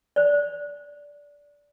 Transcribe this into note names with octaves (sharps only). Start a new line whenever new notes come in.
C5 D5